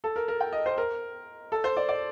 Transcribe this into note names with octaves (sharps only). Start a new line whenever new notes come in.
A4
A#4
A#4
G5
D#5
C5
A#4
A4
C5
D5
D5